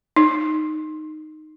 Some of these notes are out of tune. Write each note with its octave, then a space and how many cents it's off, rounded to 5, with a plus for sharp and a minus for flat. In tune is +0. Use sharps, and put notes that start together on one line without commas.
D#4 -5